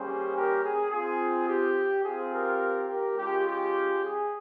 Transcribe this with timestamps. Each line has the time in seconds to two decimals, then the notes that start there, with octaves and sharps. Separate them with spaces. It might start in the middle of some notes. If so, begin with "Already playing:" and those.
Already playing: G3 A#3 C#4 G4 G#4 C5
0.34 G4 A#4
0.63 G#4
0.90 C4 F4 G#4
1.48 G4
2.03 C4 F4 G#4
2.32 G4 A#4
2.88 G4 A#4
3.16 G#3 C#4 F4 G4
3.45 G4
4.02 G#4